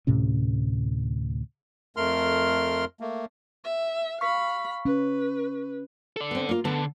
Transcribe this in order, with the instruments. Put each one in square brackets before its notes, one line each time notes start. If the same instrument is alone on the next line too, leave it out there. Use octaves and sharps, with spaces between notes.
[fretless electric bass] D2 A2 C3 C#4
[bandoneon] F2 A3 A#4 C6 F6
A3 A#3
[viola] E5
[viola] F5 B5 [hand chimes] C#6 B6
[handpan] C#4 [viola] B4
[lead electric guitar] A4 D5
[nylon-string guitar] B3 C4
A#3 F4
[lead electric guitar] D3 [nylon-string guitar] B3 A4